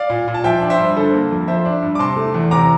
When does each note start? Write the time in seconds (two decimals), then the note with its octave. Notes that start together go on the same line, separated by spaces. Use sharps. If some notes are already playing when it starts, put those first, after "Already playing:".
Already playing: D5 F5
0.10 A#2
0.28 A#2
0.34 A5
0.44 F3 E5 G5
0.61 D4
0.70 C5 E5
0.79 G2
0.97 D3 A4 C5
1.13 A#3
1.31 F2
1.47 F3 C5 E5
1.65 D4
1.82 G2
1.95 D6
1.99 C3 A5 C6
2.16 A3
2.34 E2
2.51 C3 A#5 D6